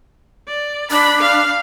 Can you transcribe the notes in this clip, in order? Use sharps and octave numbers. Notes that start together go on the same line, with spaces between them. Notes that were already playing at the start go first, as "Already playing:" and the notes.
D5
D4 B5
F5